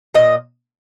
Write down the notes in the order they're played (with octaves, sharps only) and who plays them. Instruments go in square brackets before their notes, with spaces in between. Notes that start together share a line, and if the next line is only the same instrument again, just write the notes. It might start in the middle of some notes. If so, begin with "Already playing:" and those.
[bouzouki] A#2 D#5